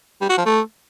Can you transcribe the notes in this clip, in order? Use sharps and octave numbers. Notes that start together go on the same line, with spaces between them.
G3
F#4
F3
A3